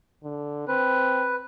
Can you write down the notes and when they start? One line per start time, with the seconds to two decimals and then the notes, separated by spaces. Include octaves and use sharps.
0.24 D3
0.68 C4 B4